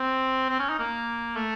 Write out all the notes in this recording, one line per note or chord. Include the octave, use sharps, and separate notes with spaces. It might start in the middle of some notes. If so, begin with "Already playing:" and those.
Already playing: C4
C4
C#4
D#4
A#3
A3